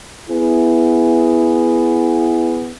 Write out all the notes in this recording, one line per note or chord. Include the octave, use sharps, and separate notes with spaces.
B3 E4 G#4